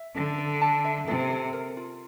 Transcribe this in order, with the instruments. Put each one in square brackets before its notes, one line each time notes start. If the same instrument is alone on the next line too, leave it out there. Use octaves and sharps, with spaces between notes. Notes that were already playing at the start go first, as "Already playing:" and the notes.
Already playing: [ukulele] E5
[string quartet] D3 [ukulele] A4
[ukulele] A4
A5
E5
[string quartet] C3 [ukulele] A4
[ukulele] A4
A#4
F4